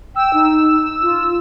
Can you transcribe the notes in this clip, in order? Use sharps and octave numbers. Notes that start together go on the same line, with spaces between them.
G5 E6
D#4
F4